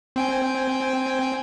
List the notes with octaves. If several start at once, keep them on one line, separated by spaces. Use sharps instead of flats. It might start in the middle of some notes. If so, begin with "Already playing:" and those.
C4 G5 G#5